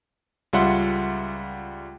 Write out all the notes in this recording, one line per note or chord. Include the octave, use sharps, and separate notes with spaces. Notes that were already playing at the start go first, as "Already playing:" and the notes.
C#2 G3 F4 E5 F#5 C6